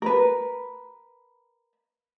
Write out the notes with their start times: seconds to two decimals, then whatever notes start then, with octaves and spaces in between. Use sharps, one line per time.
0.02 A#4 B4